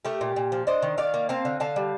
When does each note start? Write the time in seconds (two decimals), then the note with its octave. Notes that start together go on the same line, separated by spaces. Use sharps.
0.05 A3 G4 A#4
0.21 A#2
0.36 A#2
0.52 F3
0.67 D4 C5 D#5
0.82 D#3
0.98 D#3 D5 F5
1.14 A#3
1.29 C4 F5 A5
1.45 D3
1.60 D3 F5 A5
1.76 G3